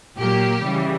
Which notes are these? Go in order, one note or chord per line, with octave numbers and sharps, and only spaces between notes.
A#2 F#3 A#3 G4
C#3 E3 G3